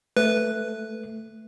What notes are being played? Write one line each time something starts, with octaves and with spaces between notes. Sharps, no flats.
A3 B4